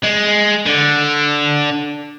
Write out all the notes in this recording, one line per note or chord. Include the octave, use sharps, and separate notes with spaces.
G#3
D3